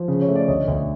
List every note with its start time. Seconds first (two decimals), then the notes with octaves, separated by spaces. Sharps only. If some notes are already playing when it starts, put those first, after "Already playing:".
Already playing: F3
0.08 C#3
0.22 C#5
0.28 A3
0.35 D5
0.48 D2 C#5 D#5
0.68 D2